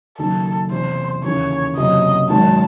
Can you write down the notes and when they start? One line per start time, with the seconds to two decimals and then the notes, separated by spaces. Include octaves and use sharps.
0.18 F#1 F#2 D#3 A4
0.71 E2 C3 E3 C5
1.24 D#2 C#3 E3 C#5
1.76 F#1 E2 C3 F#3 D#5
2.30 G#1 F#2 D#3 F#3 A5